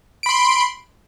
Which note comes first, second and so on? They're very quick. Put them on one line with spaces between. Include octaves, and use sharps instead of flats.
D7 B5 C6